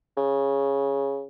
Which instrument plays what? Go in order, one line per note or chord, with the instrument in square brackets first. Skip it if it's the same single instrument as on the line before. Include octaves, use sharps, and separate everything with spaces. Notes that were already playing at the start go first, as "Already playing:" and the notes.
[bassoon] C#3